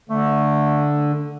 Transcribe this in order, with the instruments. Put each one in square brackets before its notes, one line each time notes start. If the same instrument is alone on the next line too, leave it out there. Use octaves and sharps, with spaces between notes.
[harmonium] D3 [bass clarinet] A3